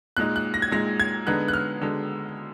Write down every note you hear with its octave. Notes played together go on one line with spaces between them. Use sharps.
A#2 G#3 D#4 F#6
F#6
A#6
G#6
A#2 G#3 D#4 A#6
G#6
D3 G#3 B3 D#4 F#6
F#6
F6
D3 G#3